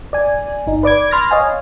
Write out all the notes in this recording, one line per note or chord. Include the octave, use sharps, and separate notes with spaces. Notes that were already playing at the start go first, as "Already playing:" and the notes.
D5 G#5
G1 D#4
B4 D5 D6 G#6
B5 C6 F6 A6 A#6
C#5 D#5 F5 G#5